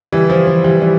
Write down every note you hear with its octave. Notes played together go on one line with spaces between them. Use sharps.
E3 G3
F3
F3
E3 G3
E3 G3